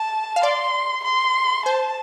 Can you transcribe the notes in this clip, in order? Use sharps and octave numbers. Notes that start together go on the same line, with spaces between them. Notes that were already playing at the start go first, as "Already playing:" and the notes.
Already playing: A5
F5
D5 C6
C6
C5 A5